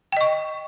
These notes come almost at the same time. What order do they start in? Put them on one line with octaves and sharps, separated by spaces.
G5 D#5 C#6